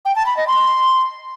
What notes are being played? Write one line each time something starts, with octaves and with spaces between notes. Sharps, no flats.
G5
A5
B5
D#5
C6